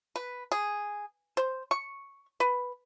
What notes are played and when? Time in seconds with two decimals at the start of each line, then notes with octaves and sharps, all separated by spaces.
0.16 B4
0.52 G#4
1.37 C5
1.71 C#6
2.40 B4